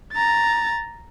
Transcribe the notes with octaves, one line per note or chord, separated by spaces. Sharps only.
A#5 A6